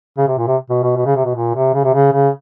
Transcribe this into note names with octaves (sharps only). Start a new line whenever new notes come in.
C#3
C3
A#2
C3
B2
B2
B2
C#3
C3
B2
A#2
C3
C#3
C3
C#3
C#3